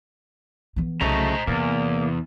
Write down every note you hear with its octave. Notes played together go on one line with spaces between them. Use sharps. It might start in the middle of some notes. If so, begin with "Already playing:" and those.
E3 B3
C2 C#3 F#3 A3 C5 D#5 A#5
E2 C3 A#3